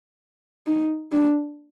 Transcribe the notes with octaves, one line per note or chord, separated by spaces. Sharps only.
D#4
D4